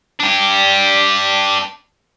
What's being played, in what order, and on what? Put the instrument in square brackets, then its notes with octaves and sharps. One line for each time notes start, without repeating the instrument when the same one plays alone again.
[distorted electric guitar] D4 G4